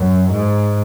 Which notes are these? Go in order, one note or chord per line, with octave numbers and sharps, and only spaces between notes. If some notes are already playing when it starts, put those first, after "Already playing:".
Already playing: F#2
G#2